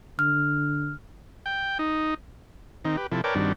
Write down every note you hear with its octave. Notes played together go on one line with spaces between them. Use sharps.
D3 F6
G5
D#4
D#3 C4 D#4
G4 B4
C3 F3 E4 A4
A#4 B4 C#5 D5 G5 A5
G2 D#3 G3 C4 D4 F#4